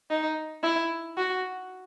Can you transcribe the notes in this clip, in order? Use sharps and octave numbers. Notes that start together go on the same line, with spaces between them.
D#4
E4
F#4